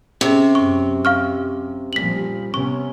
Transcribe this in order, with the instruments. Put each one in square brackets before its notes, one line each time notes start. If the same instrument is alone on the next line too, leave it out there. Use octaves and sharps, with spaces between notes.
[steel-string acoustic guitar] C3 [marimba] C#4 G#4
[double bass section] F#2 [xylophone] C#6
[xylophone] F5 C#6 F6
[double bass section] A#2 F3 G3 [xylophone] B6 F#7
[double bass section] C3 B3 C#4 [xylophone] C#6